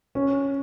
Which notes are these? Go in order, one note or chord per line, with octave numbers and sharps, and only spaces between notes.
C#4